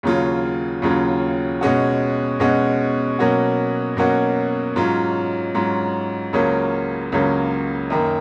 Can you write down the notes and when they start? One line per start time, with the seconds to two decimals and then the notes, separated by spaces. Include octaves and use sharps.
0.03 D#2 C#3 F#3 C#4 F4
0.82 D#2 C#3 F#3 C#4 F4
1.61 B2 G#3 C#4 F#4
2.40 B2 G#3 C#4 F#4
3.19 B2 F#3 A#3 C#4 F#4
3.97 B2 F#3 A#3 C#4 F#4
4.76 G#2 F#3 C#4 F4
5.55 G#2 F#3 C#4 F4
6.33 C#2 C#3 F#3 A#3 C#4
7.12 C#2 C#3 F#3 A#3 C#4
7.90 F#2 D#3 A#3